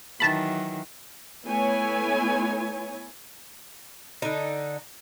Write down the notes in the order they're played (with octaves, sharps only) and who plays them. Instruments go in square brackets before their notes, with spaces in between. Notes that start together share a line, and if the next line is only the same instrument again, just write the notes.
[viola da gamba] D#3 E3 F#3 [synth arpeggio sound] A5 B5
[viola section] A3 B3 E4 C#5 G#5
[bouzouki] D3 D#4